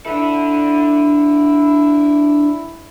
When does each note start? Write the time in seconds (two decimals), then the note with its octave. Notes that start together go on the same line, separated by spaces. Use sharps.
0.06 D4 E4 A4